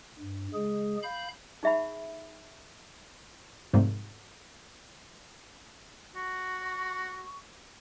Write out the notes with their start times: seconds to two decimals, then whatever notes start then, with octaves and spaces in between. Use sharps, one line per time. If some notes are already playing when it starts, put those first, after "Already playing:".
0.19 G2
0.54 C#3 G#3 G#4
1.03 F5 B5 G6
1.63 D#4 G#4 E5 F#5 B5
3.73 F2 G#2 C3 G3 A3 A#3
6.15 F#4 C#6